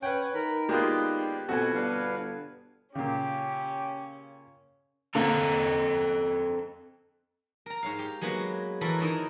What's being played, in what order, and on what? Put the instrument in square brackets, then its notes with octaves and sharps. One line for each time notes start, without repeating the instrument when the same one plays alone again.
[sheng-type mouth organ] C#4 C#5 F#5 [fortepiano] B4 G5
[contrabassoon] D#3 [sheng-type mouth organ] A#4 B5
[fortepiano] G#3 A#3 F4 [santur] B3 G4 [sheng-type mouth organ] D5 G5
[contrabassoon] F2 [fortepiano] B2 F#4 [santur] A4 G#5
[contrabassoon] G1 [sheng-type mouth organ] D4 B4 F5
[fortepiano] A#2 C#3 [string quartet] C#4 [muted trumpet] G4
[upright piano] D3 A#3 [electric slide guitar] C4 A4 A#5
[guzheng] A#4 A#5
G#2 C#5 F5
G4
F#3 G#3 A#3 B3 F#4
E3 F#4 A4 A#4 B5
D#3 D#4 E4 A#4 C#5